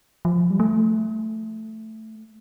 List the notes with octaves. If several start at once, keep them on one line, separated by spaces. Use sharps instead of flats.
F3
G3
A3